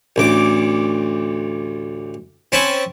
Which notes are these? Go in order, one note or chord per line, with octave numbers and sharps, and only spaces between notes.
A1 D2 D6
C4 C#4 G#5 A5 B5